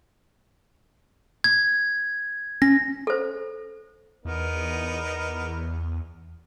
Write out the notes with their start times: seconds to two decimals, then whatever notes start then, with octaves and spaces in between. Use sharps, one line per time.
1.44 G#6
2.62 C#4 A#6
3.07 A4 C5
4.25 E2 B3 D#4 A#4